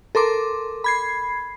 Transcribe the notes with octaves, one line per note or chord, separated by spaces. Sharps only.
A4 A#4 C6 D6
B5 G#6 C7